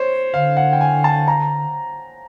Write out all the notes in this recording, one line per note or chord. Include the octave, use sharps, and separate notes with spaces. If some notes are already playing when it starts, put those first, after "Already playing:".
Already playing: C5 C#5
D3 F5
F#5
G5
G#5
A5
A#5